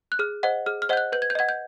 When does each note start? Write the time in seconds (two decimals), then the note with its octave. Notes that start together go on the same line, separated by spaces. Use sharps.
0.12 F#6
0.19 G#4 F6
0.43 C5 D#5 F#5
0.66 G#4 F6
0.82 F6
0.89 C5 D#5 F#5 G6
0.97 F#6
1.12 B4 G6
1.22 G#6
1.30 G6
1.35 D#5 F#5 G#6
1.49 G6